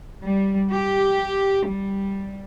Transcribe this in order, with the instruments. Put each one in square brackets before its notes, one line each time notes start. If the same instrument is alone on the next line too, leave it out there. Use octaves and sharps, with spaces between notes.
[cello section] G3
G4
G3